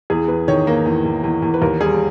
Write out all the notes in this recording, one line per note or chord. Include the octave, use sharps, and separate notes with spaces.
E2 G#4
E2 B4
D#3 C#5
A#3
E2
E2
E2
E2
B4
D#2 A#4
G3 G#4